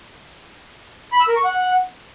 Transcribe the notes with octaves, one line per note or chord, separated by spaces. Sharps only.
B5
E6
A#4
C#6
F#5